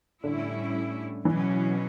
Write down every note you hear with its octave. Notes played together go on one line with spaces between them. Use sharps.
A2 D3 G3 C#4 E4
B2 E3 F#3 C#4